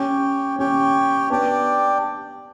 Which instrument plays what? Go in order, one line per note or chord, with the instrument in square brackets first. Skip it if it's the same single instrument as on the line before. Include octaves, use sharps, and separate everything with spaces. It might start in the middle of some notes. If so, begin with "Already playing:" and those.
Already playing: [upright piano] C#4 [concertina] G4 C#5 G5
[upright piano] C#4 [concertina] G4 C#5 G5
[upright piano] B3 [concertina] D4 G4 D5 G5